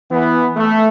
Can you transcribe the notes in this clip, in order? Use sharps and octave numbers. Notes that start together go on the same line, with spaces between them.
E3 B3
A3